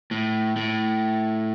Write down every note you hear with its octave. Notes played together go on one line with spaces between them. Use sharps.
A2
A2